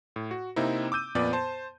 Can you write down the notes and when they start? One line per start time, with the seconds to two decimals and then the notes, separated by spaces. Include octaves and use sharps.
0.16 A2
0.31 F#4
0.56 C3 A#3 C4 D#4 E4
0.92 D6 E6 G6 D#7
1.15 F2 A#2 B3 D5
1.33 C5 A5